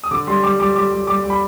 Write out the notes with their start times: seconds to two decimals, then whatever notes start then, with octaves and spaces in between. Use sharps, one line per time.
0.04 D#6
0.11 D3 D6
0.27 G3 C6
0.43 G3 D6
0.60 G3 D6
0.76 G3 D6
0.91 G3
1.07 G3 D6
1.23 G3
1.30 B5